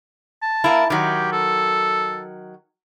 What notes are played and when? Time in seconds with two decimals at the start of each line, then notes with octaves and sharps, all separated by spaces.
0.43 A5
0.64 A#3 E4
0.90 D#3 F#3 G4
1.32 A4